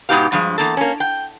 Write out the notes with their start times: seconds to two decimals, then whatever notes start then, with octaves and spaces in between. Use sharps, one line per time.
0.09 G#2 B2 D#4 G4 F5
0.32 G2 F3 G#3
0.58 E2 A#3 A4
0.77 A#3 C#4
1.00 G5